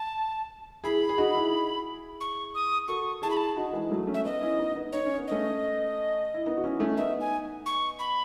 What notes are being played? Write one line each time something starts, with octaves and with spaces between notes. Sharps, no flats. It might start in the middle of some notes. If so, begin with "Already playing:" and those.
Already playing: A5
E4 G#4 B5
G#4
D#4 F#4
E4 G#4
C#6
D#6
F#4 A4 C#6
E4 G#4 A5
B5
A5
D#4 F#4
E3 G#3
F#3 A3
A3 C#4
E5
B3 D#4 D#5
C#4 E4
B3 D#4
B3 D#4
D#4 C#5
C#4
B3
A3 C#4 D#5
E4
B3 D#4
F#4
C#4 E4
A3 C#4
B3 D#4 E5
G#5
C#6
B5